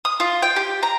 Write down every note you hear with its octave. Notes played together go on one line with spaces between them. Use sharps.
D#6
F4
G5
G4
A#5